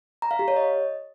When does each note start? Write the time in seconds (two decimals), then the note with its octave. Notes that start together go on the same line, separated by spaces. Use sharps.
0.22 A#5
0.31 F5
0.39 G4
0.48 C#5
0.56 D#5